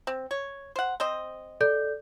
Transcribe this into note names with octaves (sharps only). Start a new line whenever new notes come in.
C4
C#5
C5 F#5
C4 C5 D#5
A4 D5 G6